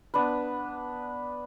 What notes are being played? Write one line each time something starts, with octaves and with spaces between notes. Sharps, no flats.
B3 D4 B4